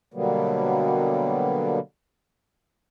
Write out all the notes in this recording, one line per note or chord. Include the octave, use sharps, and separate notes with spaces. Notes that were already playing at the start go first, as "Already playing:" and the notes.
B2 D3 F#3 G3 A#3 B3